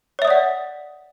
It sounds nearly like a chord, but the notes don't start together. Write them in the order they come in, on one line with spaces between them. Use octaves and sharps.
C#5 E5 D#6 D5 F#5